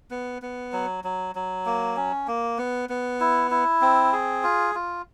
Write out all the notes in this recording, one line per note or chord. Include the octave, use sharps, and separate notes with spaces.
B3
B3
F#3
F#3
F#3
A#3
C#4
A#3
B3
B3
E4
E4
C4
G#4
F4
F4